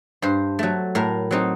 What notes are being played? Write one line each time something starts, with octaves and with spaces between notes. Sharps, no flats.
G2 C5
F#3 A3
A2 A#4
F#3 C4 D#4